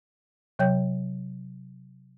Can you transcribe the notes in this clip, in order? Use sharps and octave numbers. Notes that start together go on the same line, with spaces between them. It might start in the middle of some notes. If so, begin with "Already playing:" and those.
C3 F#3 C#5 G5 G6